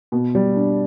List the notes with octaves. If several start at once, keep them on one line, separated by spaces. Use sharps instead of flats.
B2
G3
D4